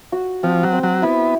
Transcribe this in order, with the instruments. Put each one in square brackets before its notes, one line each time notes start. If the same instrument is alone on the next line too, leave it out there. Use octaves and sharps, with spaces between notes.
[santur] F#4
[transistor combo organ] F3 [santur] C4
[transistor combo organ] F#3
[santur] C4
[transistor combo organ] F#3
[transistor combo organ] B3 [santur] E4